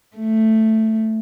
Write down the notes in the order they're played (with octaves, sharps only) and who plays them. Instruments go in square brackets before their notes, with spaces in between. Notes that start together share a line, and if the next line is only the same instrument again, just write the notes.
[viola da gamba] A3